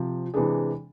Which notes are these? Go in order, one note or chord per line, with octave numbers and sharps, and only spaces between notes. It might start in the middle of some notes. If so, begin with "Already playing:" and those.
Already playing: C3 F3
C3 E3 G#3 D4 G#4